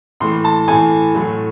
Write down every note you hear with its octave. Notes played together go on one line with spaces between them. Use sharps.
A2 E3 A3 C6
A5
A2 E3 A3 G#5
A2 F#3 A3